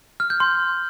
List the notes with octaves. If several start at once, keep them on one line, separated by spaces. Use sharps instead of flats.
F6
G6
C6